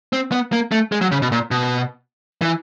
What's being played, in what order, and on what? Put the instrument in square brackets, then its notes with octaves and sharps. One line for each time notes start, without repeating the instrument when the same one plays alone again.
[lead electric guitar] C4
B3
A#3
A3
G#3
F#3
C#3
B2
A#2
B2
E3